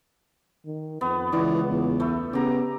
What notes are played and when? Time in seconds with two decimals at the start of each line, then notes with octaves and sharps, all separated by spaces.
0.66 D#3
1.01 F2 B3
1.32 C#2 E3 D5 C#6
1.70 E2
2.00 A3 B4 E5
2.33 C#3 B3 G4 A#5